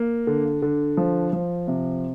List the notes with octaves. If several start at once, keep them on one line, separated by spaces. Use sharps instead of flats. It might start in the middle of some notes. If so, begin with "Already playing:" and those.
Already playing: A#3
D3
D3
F3
F3
C3